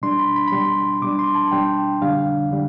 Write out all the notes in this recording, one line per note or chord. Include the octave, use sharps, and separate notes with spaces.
B2 G3 D4 C6
B5
B5
B5
B2 G3 D4 C6
B2 G3 D4 D6
C6
A5
B2 G3 D4 G5
F2 D3 G3 D4 F5
D3 G3 D4